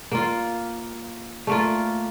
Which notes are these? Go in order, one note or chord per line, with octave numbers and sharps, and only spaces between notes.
A#3 F4
A3 A#3 F4